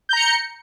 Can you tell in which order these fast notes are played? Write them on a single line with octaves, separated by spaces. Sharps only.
G6 A#5 C#7